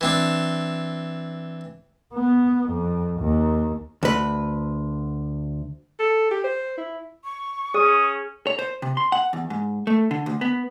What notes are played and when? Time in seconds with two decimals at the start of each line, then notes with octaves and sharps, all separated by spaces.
0.01 E3 C4 D4
2.13 B3
2.69 F2
3.21 D#2
4.03 D2 B4
5.99 A4
6.31 G4
6.44 C5
6.78 E4
7.24 C#6
7.74 C#4 G#4 D#6
8.47 C#5
8.59 C5
8.82 C3
8.97 C6
9.12 F#5
9.33 E2
9.50 G#2
9.87 A3
10.11 D3
10.26 D2
10.41 B3